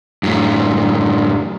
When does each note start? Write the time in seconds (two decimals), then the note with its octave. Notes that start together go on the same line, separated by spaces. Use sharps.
0.23 F#2 A2